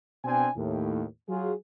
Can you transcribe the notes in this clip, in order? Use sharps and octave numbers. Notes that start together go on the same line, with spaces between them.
B2 C4 D4 G5 G#5
D#2 A2
F#3 F4 G#4